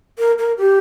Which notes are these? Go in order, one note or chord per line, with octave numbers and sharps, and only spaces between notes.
A#4
A#4
G4